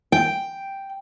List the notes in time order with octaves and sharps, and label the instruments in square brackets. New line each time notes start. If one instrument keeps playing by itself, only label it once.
[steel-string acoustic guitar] G5